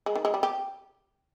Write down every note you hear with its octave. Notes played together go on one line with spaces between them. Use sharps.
G#3
D#3
G#3
G3
G4